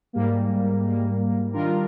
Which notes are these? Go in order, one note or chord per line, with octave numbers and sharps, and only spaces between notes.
G#2 G3 A#3
G#2 G3 A#3
D#3 G3 D4 F4 A#4